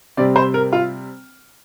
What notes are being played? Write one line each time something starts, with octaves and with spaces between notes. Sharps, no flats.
C3 G3 C4 D5
C5
A#4
F4